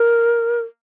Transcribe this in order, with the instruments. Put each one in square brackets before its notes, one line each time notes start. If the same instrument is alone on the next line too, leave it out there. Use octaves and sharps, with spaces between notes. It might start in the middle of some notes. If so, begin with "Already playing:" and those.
Already playing: [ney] A#4